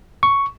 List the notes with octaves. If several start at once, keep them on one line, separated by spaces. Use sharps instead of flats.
C#6